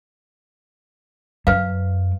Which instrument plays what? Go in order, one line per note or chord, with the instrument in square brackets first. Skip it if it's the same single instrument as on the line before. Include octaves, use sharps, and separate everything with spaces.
[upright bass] F#2 [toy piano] B4 F5